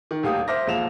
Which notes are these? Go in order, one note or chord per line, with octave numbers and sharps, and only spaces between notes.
D#3
D#1 D2 G4 F5 D#6
C5 E5 D6 F6 A#6
E1 D#2 F3 F5 E7 F7